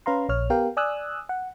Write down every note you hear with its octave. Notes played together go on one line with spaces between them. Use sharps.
C#4 B4 F5 A#5 C6
A#1 C#5 F6
B3 G4 A#4 F5 G5
D5 G#5 D#6 E6 F#6
F#5